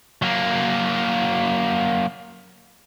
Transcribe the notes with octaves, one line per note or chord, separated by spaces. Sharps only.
F#3 A#3